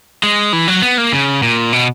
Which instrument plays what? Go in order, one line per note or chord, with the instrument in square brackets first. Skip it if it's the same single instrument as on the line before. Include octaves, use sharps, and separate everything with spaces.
[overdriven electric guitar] G#3
E3
F#3
B3
A#3
C#3
A#2
B2